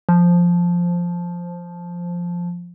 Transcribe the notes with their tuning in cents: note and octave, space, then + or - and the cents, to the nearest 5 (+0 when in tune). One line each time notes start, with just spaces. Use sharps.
F3 +0